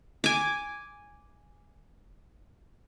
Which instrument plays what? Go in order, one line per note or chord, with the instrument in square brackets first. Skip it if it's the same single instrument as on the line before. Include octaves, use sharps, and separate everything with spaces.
[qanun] G#5 D6